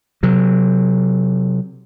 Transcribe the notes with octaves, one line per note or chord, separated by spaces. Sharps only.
C3 F#3